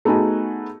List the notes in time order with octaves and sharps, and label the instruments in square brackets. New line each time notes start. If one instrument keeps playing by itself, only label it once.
[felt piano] A3 B3 D#4 F#4 G#4